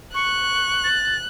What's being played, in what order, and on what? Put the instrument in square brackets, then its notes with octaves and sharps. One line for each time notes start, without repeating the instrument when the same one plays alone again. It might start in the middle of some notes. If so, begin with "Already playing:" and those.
[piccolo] C#6 [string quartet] F#6
[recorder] A6